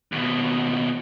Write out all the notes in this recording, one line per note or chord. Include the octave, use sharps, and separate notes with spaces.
D#2 B2